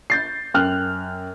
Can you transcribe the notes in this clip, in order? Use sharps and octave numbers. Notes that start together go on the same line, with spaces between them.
G6 A6 C7
F#2 G5 F6 F#6